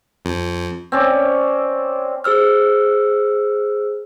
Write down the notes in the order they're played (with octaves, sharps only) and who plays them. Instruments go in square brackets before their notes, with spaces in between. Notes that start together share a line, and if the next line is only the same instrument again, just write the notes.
[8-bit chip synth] F2
[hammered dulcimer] C4 C#4 D5
[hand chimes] G#4 C5 E6 F6